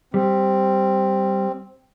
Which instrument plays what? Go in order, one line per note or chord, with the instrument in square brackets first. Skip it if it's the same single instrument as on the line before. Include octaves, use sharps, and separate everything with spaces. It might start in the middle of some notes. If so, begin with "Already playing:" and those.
[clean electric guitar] G3 [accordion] C4